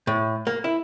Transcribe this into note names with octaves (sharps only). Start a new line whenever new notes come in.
A2
A#3
E4